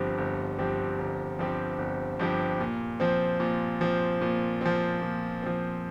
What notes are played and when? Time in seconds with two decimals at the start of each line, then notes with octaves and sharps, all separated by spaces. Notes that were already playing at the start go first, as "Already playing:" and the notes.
Already playing: G1 G2 F3 C4 G4
0.18 G1
0.58 G2 F3 C4 G4
0.99 G1
1.39 G2 F3 C4 G4
1.78 G1
2.20 G2 F3 C4 G4
2.60 A#2
3.00 F3 C4
3.40 A#2
3.81 F3 C4
4.21 A#2
4.61 F3 C4
5.01 A#2
5.43 F3 C4